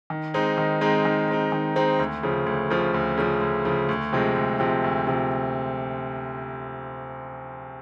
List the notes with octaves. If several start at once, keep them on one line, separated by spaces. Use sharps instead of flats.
D#3
G#3 C4 D#4
D#3
G#3 C4 D#4
D#3
G#3 C4 D#4
D#3
G#3 C4 D#4
D2
C#3 F3
D2
C#3 F3
D2
C#3 F3
D2
C#3 F3
D2
C3 F3 G#3
D2
C3 F3 G#3
D2
C3 F3